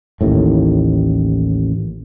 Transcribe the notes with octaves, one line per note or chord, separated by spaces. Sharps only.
A1 D#2 A2